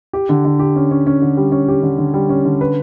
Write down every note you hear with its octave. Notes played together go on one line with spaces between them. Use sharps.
G4
D3
D3
G4
C#4
C#4
C#4
D3
G3
C#4
G4
D3
D3
G3
C#4
D3
B4